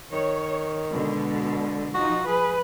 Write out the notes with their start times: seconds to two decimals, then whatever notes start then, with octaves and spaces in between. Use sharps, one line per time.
0.12 D#3 C#5
0.91 B2 D3 G#3
1.94 F3 D#4 F#4
2.27 G#4 B4